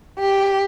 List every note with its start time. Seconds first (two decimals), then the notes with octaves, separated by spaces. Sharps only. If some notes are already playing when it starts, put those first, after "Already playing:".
0.19 G4